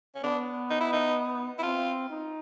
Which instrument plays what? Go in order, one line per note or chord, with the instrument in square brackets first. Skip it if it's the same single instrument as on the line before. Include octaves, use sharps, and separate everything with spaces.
[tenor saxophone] C#4
[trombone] B3 [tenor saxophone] D4
[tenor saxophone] D#4
E4
D#4
E4
[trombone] C4 [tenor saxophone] F4
[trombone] D#4